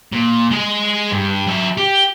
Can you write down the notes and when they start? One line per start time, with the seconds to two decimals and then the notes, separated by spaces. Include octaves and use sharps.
0.12 A#2
0.51 G#3 G#4
1.11 G2
1.47 F#3 E5
1.77 G4